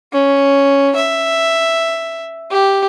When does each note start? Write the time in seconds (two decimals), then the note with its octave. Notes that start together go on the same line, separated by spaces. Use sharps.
0.13 C#4
0.96 E5
2.52 G4